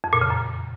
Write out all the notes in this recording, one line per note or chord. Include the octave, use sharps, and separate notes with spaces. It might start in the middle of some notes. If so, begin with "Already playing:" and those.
F2
A#2
C#3
F#2